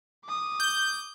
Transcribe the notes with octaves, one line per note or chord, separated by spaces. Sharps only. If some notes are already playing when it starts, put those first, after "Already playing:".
D6 D#6
G6